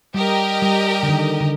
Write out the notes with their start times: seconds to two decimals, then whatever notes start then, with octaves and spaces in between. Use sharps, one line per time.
0.14 G3 G4 A#4 D#5 G5
0.62 G3
1.03 D3
1.09 D#3
1.41 D3